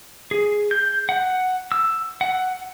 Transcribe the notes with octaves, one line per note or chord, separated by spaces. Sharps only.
G#4
G6
F#5
E6
F#5